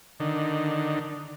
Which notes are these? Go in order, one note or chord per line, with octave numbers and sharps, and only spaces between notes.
D3 D#3